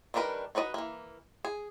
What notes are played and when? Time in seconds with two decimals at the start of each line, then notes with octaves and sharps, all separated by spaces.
0.14 D#3 G3 D4 A#4 B4
0.55 D#4 F#4 B4 D5 D#5
0.74 E3 A#3
1.45 G#4